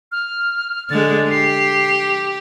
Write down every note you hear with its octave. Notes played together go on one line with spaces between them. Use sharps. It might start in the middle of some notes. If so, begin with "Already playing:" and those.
F6
D3 G#3 A6
G4 C7